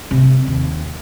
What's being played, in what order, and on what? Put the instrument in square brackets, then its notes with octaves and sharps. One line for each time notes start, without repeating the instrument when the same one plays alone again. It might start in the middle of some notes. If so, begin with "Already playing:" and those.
[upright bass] C3
D#2